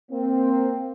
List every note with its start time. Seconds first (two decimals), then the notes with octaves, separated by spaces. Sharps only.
0.11 A#3 C4